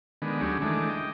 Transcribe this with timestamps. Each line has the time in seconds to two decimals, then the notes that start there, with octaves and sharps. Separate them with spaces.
0.22 D3 D#3 G#3 B3
0.41 D2 F#3 C#4 G4 G#4
0.62 D#3 E3 G#3 A3 D4
0.90 D#5 G5